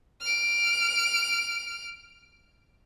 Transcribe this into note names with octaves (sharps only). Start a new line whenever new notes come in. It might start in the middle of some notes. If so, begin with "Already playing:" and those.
F6 D7